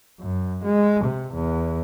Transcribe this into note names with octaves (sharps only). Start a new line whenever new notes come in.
F#2
G#3
C3
E2